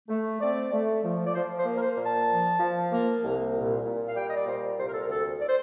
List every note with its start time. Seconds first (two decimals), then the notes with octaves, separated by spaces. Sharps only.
0.09 A3
0.40 C4 D5
0.72 A3
1.03 F3
1.25 D5
1.34 F3 C5
1.58 C5
1.65 A#3
1.76 A#4
1.81 C5
1.96 A#2
2.04 A5
2.29 F3
2.59 F3
2.91 A#3
3.22 C2
3.54 A#2
3.84 A#2
4.07 F5
4.15 G3 G5
4.28 D#5
4.37 D5
4.46 A#2 C5
4.78 C2 C5
4.86 A#4
4.93 A4
5.00 A#4
5.08 D2 A4
5.40 D5
5.47 C5